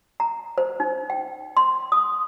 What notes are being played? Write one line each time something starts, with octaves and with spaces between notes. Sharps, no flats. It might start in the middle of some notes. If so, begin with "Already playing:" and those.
A#5
C5
D#4
G5
C6
D#6